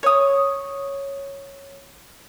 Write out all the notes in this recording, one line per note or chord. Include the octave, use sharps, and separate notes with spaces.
C#5 D#6